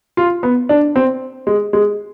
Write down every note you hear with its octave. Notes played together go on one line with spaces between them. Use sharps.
F4
B3
D4
C4
G#3
G#3